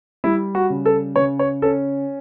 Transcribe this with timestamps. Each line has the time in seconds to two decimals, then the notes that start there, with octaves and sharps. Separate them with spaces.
0.24 G3 E4
0.55 F#4
0.70 C#3
0.86 A4
1.16 C#3 C#5
1.39 C#5
1.62 C#4 A4